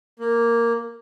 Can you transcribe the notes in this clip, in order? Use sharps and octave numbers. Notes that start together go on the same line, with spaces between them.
A#3